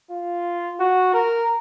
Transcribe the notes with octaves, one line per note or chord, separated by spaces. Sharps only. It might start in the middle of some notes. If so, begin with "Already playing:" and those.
F4
F#4
A#4